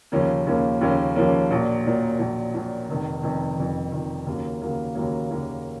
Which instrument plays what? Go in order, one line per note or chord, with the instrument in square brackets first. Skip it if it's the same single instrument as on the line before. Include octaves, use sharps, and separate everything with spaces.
[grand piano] D#2 C#3 F3 A#3 C#4
D#2 C#3 F3 A#3 C#4
D#2 C#3 F3 A#3 C#4
D#2 C#3 F3 A#3 C#4
A#1 A#2 F#3
A#1 A#2 F#3
A#1 A#2 F#3
A#1 A#2 F#3
F1 F2 D#3
F1 F2 D#3
F1 F2 D#3
F1 F2 D#3
D#2 C#3 F#3 A#3
D#2 C#3 F#3 A#3
D#2 C#3 F#3 A#3
D#2 C#3 F#3 A#3